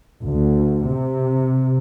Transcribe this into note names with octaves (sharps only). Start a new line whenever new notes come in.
D2
C3